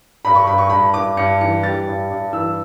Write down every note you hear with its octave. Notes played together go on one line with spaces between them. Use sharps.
G2 B5
C#6
G2 B5
C#6
G2 B5
G2 D6
G2 C#7
E3 C#7
G3 A6
G2
G2
E3 E6